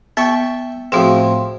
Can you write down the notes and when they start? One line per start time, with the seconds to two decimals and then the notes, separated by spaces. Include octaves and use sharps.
0.17 B3 E5 G5 C#6
0.92 A2 F3 C4 F#4 G#4